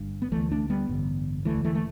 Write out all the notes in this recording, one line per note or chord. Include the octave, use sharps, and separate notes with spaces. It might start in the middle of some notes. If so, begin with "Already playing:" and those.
Already playing: G1 G2
B3
D2 D3 E3 A3
A3 D4
G3 B3
A1 G2 D3
E1 D2 D3 E3 A3
E3 A3
A3